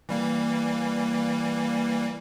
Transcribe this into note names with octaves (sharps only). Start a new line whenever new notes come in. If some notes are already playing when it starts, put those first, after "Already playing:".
E3 G3 A#3